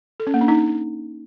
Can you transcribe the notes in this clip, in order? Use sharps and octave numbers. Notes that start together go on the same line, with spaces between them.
A4
C#4
A#3
D4
D#4